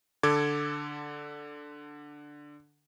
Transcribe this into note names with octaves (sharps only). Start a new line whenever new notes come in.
D3 A4 D6 G#6